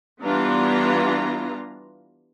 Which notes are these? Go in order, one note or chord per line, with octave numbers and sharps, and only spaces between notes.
E3 G3 B3 D4 F4 A#5